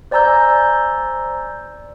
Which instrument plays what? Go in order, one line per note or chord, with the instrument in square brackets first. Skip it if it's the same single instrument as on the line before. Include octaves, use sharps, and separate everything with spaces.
[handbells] C5 D5 G#5 A#5 E6 G6